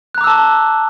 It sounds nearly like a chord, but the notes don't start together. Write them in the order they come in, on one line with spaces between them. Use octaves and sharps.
F#6 A#5 D6 E6 A5